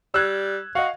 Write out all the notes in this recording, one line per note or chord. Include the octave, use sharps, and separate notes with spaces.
G3 E6 F#6 G#6
F#4 D#5 F5